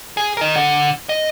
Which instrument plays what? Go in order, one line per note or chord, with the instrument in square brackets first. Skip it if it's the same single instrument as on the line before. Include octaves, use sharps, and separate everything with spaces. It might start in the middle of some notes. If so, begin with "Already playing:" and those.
[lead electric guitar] G#4
A#4 D#5
D3
D#5